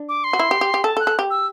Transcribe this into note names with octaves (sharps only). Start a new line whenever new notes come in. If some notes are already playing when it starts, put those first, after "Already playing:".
Already playing: D4
D6
C6
F#4
E4
G4
G4
G4
A4 A5
A4
F#6
A4
G4
E6